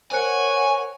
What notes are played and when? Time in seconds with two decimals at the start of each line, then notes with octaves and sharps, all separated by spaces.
0.12 A#4 C5 C#5 F#5 G#5 F#6 C#7